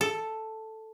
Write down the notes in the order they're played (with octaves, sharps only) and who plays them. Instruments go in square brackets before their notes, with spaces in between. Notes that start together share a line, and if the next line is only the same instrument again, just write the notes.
[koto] A4